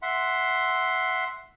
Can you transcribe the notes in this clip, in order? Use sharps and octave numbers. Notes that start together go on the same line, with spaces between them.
E5 F#5 C6